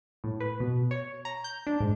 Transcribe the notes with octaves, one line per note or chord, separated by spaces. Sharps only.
A2
B4
B2
C#5
A#5
G6
D4
G#2